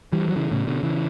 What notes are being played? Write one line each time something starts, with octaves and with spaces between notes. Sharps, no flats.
E3 G3
F#3
C#3 E3
A2 C#3
B2 D3
C#3 E3